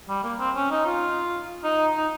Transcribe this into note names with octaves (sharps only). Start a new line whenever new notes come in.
G3
A#3
C4
C#4
D#4
F4
D#4
D#4